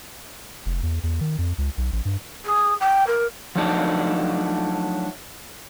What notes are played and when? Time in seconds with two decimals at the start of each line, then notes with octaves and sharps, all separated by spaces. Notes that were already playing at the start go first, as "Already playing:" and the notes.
0.66 F1
0.83 E2
1.03 E2
1.21 D#3
1.38 F2
1.58 C#2
1.78 B1
1.93 A1
2.05 G2
2.45 G#4
2.80 G5
3.06 A#4
3.55 F3 F#3 A3 D4 D#4